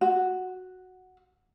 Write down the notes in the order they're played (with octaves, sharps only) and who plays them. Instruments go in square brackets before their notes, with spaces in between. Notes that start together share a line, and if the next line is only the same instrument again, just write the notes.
[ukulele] F#4